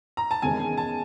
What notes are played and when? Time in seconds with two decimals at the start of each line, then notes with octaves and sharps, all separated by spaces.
0.17 A#5
0.31 A5
0.42 E2 C3 D#3 G#3 C#4 G#5
0.77 A5